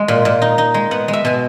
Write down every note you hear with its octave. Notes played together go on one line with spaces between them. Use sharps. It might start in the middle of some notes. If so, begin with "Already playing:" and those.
Already playing: G#3
A#2
A#2
D#4
D#4
G#3
B3 F#5
G#3
E5
B2 G#5